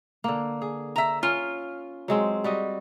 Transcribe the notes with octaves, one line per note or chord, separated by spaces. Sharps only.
D3 A#3
G#4
E5 A#5
C#4 F4 A#4
F#3 G#3 C4
G3 F#4 D#5